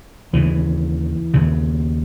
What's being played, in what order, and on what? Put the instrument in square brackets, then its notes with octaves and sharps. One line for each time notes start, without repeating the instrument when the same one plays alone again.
[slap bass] D#2 C#3 E3
D#2 C#3